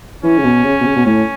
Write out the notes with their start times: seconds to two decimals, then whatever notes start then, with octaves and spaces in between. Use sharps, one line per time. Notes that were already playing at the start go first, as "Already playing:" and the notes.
0.23 E3 C#4
0.38 C#3
0.44 B2
0.64 C#3
0.80 B2
0.86 C#3
0.96 B2
1.06 A2 C#4